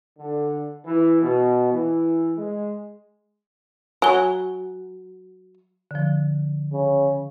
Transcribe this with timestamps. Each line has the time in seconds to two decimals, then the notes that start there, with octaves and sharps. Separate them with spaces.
0.19 D3
0.86 E3
1.23 B2
1.73 E3
2.37 G#3
4.02 F#3 G#5 G7
5.91 D3 F3
6.73 C#3